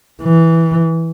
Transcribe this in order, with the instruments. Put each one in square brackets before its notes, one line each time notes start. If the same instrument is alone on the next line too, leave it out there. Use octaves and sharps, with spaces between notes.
[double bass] E3